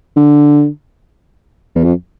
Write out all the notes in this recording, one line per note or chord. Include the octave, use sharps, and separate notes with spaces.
D3
E2
F2